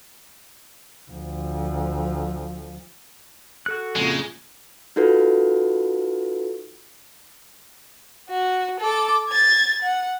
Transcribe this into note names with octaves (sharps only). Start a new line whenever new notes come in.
D2 F3
F#4 A4 F#6
F2 A#2 C#3 G#3
D#4 F4 F#4 A4 B4
F#4
A4 D6
G#6 A6
F#5